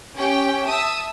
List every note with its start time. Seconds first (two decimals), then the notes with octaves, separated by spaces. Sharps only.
0.16 C#4 G4 G5
0.67 E5 A5 D#6 E6